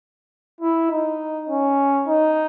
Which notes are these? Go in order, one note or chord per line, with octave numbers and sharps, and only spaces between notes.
E4
D#4
C#4
D#4